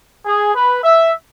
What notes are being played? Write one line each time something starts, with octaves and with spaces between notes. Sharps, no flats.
G#4
B4
E5